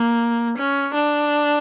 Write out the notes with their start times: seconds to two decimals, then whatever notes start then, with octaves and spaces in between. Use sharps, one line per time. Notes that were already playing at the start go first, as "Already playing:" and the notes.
Already playing: A#3
0.58 C#4
0.94 D4